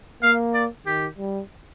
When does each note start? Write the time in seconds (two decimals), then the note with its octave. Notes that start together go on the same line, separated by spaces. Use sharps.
0.23 A#3 F5
0.54 D5
0.86 D#3 G4
1.18 G3